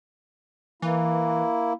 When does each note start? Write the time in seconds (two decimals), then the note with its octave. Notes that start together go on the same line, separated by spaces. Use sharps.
0.82 E3 A#3 E4